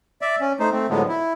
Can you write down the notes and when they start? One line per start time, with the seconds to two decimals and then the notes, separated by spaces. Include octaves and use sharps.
0.21 D5 E5
0.41 C#4
0.60 A3 D#4 C5
0.72 A3 C4
0.90 A2 D3 F3 F#3 G#3 B3
1.08 E4